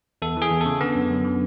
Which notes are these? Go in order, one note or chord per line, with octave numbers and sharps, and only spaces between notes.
E2 A4
E3 G#4
E2
C#3 A4
D3 B3
F#2
F#2
D3